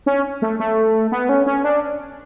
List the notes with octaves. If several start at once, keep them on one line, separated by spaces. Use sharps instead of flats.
C#4
A3
A3
B3
C#4
C#4
D4